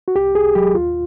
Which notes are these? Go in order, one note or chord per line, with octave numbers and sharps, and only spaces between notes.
F#4
C2 G4
C2 G#4
F#3 G4
D#2 F4